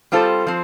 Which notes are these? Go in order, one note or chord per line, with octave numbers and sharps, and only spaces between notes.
G3 C4 F4 A4 C5
F3 C4